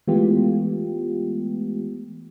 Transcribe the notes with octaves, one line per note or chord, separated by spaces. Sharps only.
E3 G#3 A3 B3 F4 G4